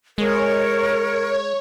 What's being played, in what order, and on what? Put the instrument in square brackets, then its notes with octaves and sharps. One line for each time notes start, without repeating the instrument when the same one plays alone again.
[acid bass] G#3 [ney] A#4 [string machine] C#5